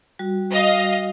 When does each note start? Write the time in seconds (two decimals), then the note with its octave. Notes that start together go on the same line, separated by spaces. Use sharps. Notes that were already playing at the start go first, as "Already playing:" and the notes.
0.19 G3 F#4
0.51 D#5 F5